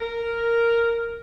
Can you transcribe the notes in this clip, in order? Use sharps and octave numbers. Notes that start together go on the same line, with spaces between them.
A#4